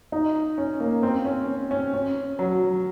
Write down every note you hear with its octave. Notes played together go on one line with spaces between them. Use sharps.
D#4
C#4
A#3
C4
C#4
C#4
C#4
F#3